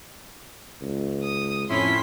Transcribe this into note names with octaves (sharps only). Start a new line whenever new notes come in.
C#2
D#6
F2 A2 C#4 E4 C6 B6